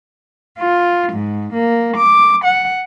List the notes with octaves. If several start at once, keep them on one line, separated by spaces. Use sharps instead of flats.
F4
G#2
A#3
D6
F#5